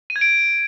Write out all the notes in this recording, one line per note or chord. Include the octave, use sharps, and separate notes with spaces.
D#7
G#6
D7